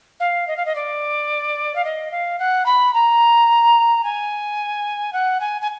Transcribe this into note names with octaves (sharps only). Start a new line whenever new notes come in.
F5
D#5
F5
D#5
D5
F5
D#5
F5
F#5
B5
A#5
G#5
F#5
G#5
G#5